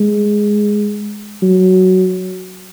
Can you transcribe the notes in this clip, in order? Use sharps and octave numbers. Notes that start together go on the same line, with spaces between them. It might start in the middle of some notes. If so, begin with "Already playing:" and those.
Already playing: G#3
F#3